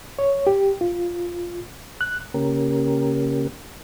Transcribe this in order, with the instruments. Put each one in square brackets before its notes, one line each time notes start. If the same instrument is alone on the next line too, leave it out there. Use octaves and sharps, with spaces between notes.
[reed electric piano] C#5
G4
F4
F#6
[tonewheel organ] C#3 A#3 C#4 G4 A#4